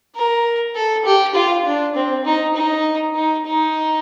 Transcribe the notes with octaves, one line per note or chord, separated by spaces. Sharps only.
A#4
A4
G4
F4
D4
C4
D#4
D#4
D#4
D#4